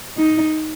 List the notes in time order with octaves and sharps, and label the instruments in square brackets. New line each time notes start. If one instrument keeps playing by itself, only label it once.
[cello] D#4